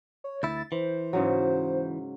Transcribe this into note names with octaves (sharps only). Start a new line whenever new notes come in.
C#5
D2 E4 A6
E3 C5
G#2 C#3 F#3